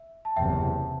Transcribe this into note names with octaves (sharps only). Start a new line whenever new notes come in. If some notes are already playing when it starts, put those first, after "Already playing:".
Already playing: E5
A5
F#1 E2 C3 E5 G5